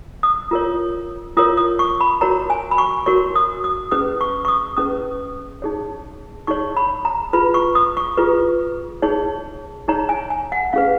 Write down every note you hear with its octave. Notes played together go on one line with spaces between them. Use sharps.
D#6
F4 A#4 C#5
F4 A#4 C#5 D#6
D#6
C#6
B5
F#4 A#4 C#5 A#5
G#5
B5
C#6
F#4 A#4 C#5 C#6
D#6
D#6
C#4 G#4 B4 D#6
C#6
C#6
D#6
C#4 G#4 B4 D#6
D#4 G#4 C#5
D#4 G#4 C#5 C#6
B5
A#5
F4 G#4 B4 B5
C#6
D#6
C#6
F4 G#4 B4
D#4 G#4 C#5
D#4 G#4 C#5 A#5
G#5
G#5
F#5
C#4 G#4 B4 F5